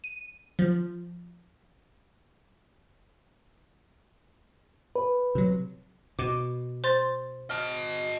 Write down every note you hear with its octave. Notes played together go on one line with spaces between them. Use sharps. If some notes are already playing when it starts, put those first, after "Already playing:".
D#7
F3
B4
C3 F#3
B2 D6
C5 C6 A6
D#5 A5 F6